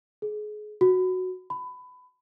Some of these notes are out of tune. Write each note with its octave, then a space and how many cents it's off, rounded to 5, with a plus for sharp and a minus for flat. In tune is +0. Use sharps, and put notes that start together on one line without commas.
G#4 +30
F#4 -5
B5 +20